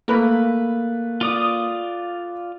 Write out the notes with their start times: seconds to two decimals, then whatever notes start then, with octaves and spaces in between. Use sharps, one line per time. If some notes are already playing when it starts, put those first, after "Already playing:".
0.08 A3 A#3 B4 B5
1.21 F4 D5 D#6